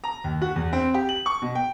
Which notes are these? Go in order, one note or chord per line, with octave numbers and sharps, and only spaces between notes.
A#5
D#2
F#4
E2
C4
G4
F#7
C#6
B2
G5